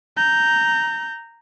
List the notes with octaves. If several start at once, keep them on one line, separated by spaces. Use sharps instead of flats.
A#5 G6